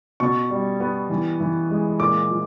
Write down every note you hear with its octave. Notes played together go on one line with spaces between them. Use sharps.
B2 C#6
G3
B3
E3
E3
G#3
A#2 D6
F3